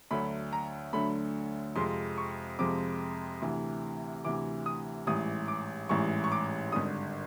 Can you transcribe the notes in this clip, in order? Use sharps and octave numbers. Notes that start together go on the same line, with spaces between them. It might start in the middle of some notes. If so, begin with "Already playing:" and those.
D2 D3 F#3 A3 B5
A#5
D2 D3 F#3 A3 B5
F2 C3 F3 G#3 C6
C#6
F2 C3 F3 G#3 D6
D2 C3 E3
D2 C3 E3 D6
D#6
A1 G#2 E3 G3 D#6
D6
A1 G#2 E3 G3 C#6
C#6
D6
G#1 G2 D3 D#6